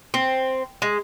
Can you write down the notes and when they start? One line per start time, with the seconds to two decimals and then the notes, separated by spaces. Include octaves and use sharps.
0.14 C4
0.82 G#3